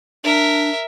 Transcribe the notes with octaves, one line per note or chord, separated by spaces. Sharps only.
D4 A#4 E5